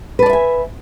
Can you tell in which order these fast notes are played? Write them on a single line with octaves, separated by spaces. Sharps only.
B4 A5 D5 E5 G#5